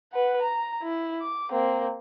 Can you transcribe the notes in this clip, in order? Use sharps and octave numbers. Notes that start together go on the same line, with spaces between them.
B4 F#5
A#5
E4
D6
A#3 C4